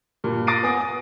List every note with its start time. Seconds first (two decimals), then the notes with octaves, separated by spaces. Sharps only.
0.24 G2 A#2
0.47 D6 A6 A#6 C7 D7 D#7
0.63 B3 G#5 D#6 A#6
0.81 D#6